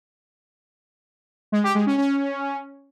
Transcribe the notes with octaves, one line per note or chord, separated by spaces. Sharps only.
G#3
G4
G#3
C#4
C#4